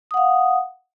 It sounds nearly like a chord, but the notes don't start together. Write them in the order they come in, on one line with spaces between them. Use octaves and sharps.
D#6 F#5 F5